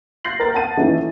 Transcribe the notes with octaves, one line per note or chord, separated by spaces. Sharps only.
G6 A6 A#6 C7 F#7
A#4 A6
F#5 A5 A6 D#7
E3 A3 C#4 D#4 E4